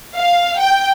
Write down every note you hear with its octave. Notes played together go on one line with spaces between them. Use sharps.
F5
G5